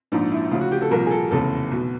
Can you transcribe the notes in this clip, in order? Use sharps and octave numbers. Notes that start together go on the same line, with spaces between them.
A#1 G#2 F3 D4
E4
D2 C#3 F3 F4
F#4
G4
A4
C2 A#2 F3 A#4
G#4
A4
F1 E2 C#3 A4
B1 B2